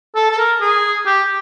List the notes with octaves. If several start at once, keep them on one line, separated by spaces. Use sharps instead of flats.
A4
A4
A#4
G#4
G4